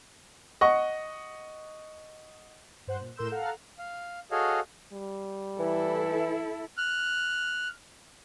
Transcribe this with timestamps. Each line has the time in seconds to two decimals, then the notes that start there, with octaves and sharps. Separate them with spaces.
0.61 D#5 F#5 C#6
2.87 G2 C5 F#5 F#6
3.01 A#2
3.16 A2 A#4 C6 E6 G6 E7
3.31 A4 F5 F#5 A#5 F6
3.79 F5
4.31 F#4 G#4 A4 C#5 D#5 F5
4.93 G3
5.59 E3 E4 A4
6.77 F6 F#6